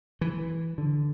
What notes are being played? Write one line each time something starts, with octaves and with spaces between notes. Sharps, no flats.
E3
D3